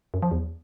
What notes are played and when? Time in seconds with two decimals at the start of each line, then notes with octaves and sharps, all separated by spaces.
0.14 F#2
0.22 F3
0.31 E2